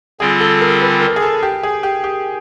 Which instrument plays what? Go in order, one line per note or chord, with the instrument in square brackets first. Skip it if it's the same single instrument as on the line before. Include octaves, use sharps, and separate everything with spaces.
[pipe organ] D3 G3 C4 F4 [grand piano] G#4
[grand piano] A4
A#4
B4
A#4
G#4
A4
G4
G#4
G4
G4